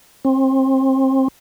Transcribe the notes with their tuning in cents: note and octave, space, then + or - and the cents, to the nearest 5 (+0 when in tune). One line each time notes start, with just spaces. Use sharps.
C4 +30